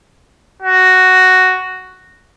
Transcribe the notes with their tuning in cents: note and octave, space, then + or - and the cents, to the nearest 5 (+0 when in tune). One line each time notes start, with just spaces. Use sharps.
F#4 +5